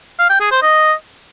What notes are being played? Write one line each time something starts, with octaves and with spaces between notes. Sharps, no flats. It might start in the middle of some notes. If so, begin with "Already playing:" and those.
F5
G5
G#4
C5
D#5